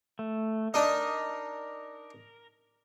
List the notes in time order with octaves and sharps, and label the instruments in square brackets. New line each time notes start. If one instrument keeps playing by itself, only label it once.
[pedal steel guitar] A3
[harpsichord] D4 D#4 D#5 [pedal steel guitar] A#4